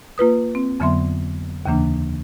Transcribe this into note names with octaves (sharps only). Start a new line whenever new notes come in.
A#3 F4 B4 D#6
C4
F2 D3 F#3 B3 E5 C6
D#2 C#3 E3 A#3 D4